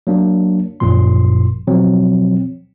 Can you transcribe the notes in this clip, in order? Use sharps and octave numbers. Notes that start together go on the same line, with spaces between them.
F#3 A#3 D4
G#1 F#2 A#2 F3 C6
B2 F3 F#3 C4